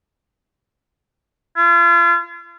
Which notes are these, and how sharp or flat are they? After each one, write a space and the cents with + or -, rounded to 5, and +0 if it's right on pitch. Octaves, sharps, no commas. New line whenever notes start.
F4 -40